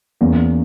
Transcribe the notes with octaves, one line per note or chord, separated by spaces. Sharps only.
E2 A#3 C#4